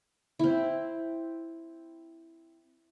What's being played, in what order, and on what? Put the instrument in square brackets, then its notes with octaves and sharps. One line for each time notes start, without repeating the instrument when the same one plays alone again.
[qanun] C4 E4